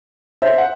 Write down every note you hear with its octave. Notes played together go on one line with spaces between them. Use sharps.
C5 E5
F#5